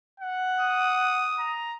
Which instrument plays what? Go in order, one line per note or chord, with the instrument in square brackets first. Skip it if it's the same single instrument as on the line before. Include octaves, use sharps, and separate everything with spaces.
[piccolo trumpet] F#5
[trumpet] D#6
[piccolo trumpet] A#5